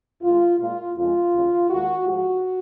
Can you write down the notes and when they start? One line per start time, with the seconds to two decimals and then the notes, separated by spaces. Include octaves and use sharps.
0.22 F#2 D#3 G#3 F4
0.59 A#2 G#3 F4
0.96 F2 C#3 G#3 F4
1.33 D#2 C#3 F#3
1.70 D#2 D#3 G#3 F#4
2.07 G#2 F3 G#3 F#4